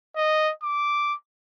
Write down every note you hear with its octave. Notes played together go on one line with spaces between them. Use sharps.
D#5
D6